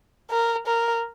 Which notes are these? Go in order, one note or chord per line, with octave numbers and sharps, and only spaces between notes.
A#4
A#4